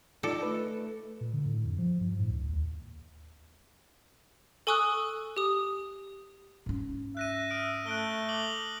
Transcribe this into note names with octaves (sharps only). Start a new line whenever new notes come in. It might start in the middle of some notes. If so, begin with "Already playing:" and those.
D#4 F4 A4 D5
A3 B4
A#2
D3
A2
F2
F3
G2
A2
C#2
D#2
A4 G#5 C#6 D#6 E6 F#6
G4 D#6
G#2 C#4
E5 F#6 A#6 D#7
D#6 F6 D7
A3 F#6 D7 G7
D6 F#7 G7